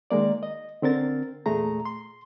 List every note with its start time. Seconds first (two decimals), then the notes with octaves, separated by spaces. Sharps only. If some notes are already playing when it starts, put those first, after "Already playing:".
0.11 D#3 G#3 A#3 D5
0.43 D#5
0.82 D3 C4 A#4 A6
1.46 E2 A#2 A3 G#4 A#5
1.85 C6